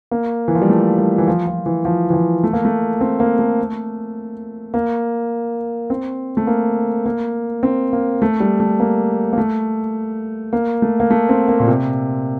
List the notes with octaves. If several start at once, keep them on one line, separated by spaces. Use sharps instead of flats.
A#3
E3
F3
G3
A3
G3
E3
F3
F3
E3
F3
E3
F3
A3
A#3
A3
C4
A#3
A3
A#3
C4
A3
A#3
A#3
C4
A#3
A3
G3
A3
A#3
A#3
A3
A#3
A3
A#3
A3
C4
A#3
A#2
C3